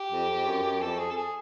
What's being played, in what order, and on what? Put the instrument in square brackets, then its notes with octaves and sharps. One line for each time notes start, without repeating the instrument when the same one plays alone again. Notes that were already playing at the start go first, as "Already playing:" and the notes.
Already playing: [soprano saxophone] G4
[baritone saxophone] F2
F2
F#2
F#2
[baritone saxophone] F2 [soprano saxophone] A4
[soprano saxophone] G#4
A4
G#4